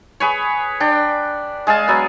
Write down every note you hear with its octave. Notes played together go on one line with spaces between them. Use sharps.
G#4 B4 C#5
D4 G5
G#3 G#4 F5 A5
F#3 B3